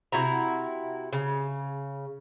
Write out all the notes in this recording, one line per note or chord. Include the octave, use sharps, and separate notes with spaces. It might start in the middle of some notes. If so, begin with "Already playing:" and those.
C3 E4 F#4 A#5
C#3